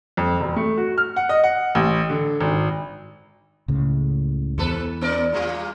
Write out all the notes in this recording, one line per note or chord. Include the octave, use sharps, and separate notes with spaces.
F2
E1
A3
F#4
F6
F#5
D#5
F#5
A1
D3
G#1
C#2 A2 C#3
E2 B2 A4 B4
B3 A#4 D5
A#2 G3 F4